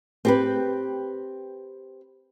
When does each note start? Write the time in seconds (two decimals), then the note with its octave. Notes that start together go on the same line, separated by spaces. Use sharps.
0.25 C4 G4 B4